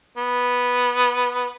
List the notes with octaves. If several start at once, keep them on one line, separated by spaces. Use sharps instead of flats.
B3